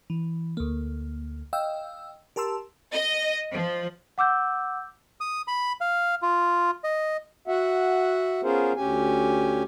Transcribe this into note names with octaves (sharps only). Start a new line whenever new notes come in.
E3
D2 A#3
D#5 F5 G5 E6
G4 A#4 A5 C6 E6
D#5
F3
F#5 D6 E6 G6
D#6
B5
F5
F4
D#5
F#4 E5 F#5
B3 C#4 F4 G#4 A#4 C5
D2 C#4 G4 G#5